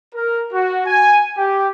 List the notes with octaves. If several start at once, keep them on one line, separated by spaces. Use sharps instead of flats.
A#4
F#4
G#5
G4